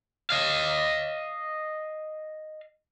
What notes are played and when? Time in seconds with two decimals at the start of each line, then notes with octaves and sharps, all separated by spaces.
0.30 D#5 F5